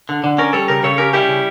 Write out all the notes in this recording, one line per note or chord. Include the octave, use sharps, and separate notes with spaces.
D3
D3
C#4 A#4 D5
G3 A4 C#5
C#3 G4 A#4
C#3 A4 C#5
C#4 G4 A#4
G3 E4 G4
C#3